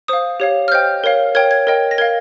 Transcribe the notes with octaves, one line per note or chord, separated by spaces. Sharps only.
C5 F5 D#6
G4 C#5 F5
F6
C5 D#5 G5 G6
A#4 C#5 F5
A#4 C#5 G5 G#6
G#6
A#4 D#5 G5
A#6
A#4 F5 G#6